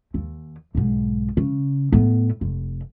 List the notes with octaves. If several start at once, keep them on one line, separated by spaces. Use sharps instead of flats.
D#2
B1 G#2
C#3
A2 B3
F1